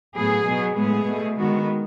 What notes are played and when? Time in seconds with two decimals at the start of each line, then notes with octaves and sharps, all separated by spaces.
0.16 A2 F#3 B3 G#4
0.47 B2 F#3 B3
0.76 A2 G#3 B3 G#4
1.07 B2 A3
1.37 D#3 G#3 B3 F#4